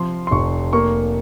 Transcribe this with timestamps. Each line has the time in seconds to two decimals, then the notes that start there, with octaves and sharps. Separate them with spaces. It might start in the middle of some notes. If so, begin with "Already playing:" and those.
Already playing: C3 F3 C6
0.27 C6
0.31 F1 C#6
0.73 A#3 C#6